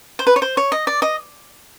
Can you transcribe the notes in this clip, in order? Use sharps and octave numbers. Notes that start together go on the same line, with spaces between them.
C5
B4
C#5
C5
C#5
D#5
D5
D#5